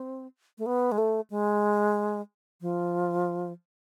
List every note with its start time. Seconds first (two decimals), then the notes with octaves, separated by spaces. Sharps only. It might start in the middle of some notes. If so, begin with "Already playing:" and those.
Already playing: C4
0.58 A3
0.66 B3
0.92 G#3
0.98 A3
1.30 G#3
2.61 F3